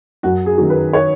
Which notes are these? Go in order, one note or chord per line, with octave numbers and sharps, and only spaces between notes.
F#2 F#4
G#4
D#3 F#3
B4
C#5